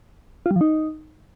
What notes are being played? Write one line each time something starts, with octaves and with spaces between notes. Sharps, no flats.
F4
G3
F3
D#4